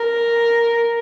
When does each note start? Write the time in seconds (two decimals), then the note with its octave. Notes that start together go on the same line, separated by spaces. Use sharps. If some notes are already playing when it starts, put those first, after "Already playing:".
Already playing: A#4